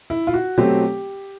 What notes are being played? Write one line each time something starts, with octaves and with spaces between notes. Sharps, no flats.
E4
F4
F#4
B2 F#3 A3 C4 G4